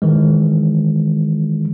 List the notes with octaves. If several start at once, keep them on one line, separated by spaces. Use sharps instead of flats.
D#3 E3 G#3